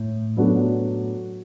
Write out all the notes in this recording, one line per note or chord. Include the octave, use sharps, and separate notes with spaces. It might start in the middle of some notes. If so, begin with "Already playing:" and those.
Already playing: A2
F#3 B3 D4 F#4 A4